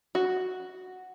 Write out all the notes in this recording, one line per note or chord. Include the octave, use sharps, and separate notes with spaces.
F#4